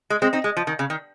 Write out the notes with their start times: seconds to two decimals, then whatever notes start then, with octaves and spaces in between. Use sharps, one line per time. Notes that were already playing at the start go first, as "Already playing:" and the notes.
0.10 G#3
0.22 G#3 C4
0.33 C4 D#4
0.44 G#3
0.57 F3
0.67 D#3
0.79 C#3
0.90 D#3